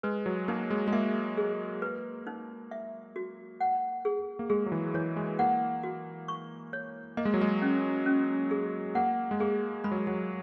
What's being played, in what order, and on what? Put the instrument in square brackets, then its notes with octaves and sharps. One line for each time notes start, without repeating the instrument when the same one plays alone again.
[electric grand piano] G#3 [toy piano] B4
[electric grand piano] F#3
[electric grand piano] A#3 [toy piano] D#4
[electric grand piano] G#3
G#3
[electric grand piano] A#3 [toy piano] E5
[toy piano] G#4
B4
D#4
E5
F#4
F#5
G#4
[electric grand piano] A#3
[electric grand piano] G#3 [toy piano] G#4
[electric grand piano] F#3
E3
[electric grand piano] E3 [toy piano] C#5
[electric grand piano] G#3
[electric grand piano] A#3 [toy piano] F#5
[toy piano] F#4
C#6
C#5
[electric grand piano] A#3 [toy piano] D#5
[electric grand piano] G#3
F#3
G#3
[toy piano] C#4
C#4
G#4
[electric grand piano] A#3 [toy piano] F#5
[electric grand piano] G#3
[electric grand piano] A#3 [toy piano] G#4
[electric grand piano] G#3 [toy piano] B5
[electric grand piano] F#3
G#3
F#3